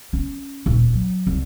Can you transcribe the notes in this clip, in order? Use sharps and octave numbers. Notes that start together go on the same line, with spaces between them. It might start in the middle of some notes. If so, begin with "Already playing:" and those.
C#4
D#1
F#3
C2